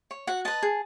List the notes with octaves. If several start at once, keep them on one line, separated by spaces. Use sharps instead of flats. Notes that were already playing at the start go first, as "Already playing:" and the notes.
C#5
F#4 F#5
B4 D#5 A5
G#4